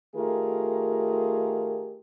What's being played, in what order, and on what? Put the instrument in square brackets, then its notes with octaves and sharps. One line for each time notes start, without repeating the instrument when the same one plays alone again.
[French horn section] D#3 A3 F4 G4 G#4 A#4